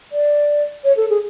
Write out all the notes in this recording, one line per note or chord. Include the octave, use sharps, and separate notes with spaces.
D5
C#5
A4
G#4